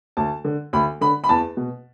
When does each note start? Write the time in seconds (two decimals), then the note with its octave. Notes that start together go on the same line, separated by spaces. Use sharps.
0.17 D2 A5
0.44 D3
0.73 D2 B5
1.01 D3 B5
1.24 B5
1.29 E2 A5
1.57 B2